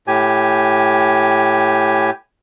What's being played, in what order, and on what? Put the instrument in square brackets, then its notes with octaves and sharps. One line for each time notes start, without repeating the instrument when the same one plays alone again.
[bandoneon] A2 G4 G#5